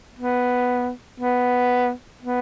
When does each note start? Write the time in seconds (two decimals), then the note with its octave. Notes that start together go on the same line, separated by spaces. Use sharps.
0.19 B3
1.20 B3
2.22 B3